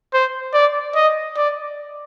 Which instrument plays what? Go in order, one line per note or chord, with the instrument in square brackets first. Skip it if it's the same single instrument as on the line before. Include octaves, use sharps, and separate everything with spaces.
[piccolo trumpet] C5
D5
D#5
D5